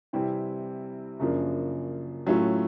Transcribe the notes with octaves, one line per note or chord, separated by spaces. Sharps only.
C3 E3 G3 C4 E4
F#2 C#3 F3 A#3 D4
A2 F#3 A3 C#4 F4